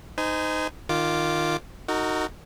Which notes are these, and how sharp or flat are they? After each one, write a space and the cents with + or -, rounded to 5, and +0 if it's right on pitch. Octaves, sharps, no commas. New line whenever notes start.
D#4 -5 C5 -40 G#5 +0
D#3 -15 F4 +0 D6 +0
D#4 +0 F#4 +0 A#4 -35